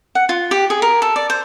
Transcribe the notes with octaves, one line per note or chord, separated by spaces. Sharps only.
F#5
F4
G4
G#4
A#4
A4
D5
C5